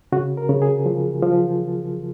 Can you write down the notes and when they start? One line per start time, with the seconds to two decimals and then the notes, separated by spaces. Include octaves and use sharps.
0.12 C#3 F#4
0.37 A#4
0.49 C#3
0.62 G#4
0.86 F3
1.23 F3